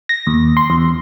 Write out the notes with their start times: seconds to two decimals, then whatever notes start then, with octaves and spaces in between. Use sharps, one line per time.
0.09 A#6
0.27 D#2
0.57 C6
0.70 E2